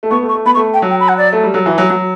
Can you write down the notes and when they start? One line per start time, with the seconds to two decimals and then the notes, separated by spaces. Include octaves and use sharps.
0.03 A3
0.11 B3 C#6
0.23 A3
0.29 C#6
0.35 A3
0.46 B3 B5
0.55 A3 C#6
0.74 G5
0.82 F#3
0.91 G5
1.00 B5
1.09 F#5
1.18 D5
1.33 A3
1.43 G3
1.53 F#3 A4
1.66 E3 F#4
1.78 F#3 G4
1.90 F#3 F#4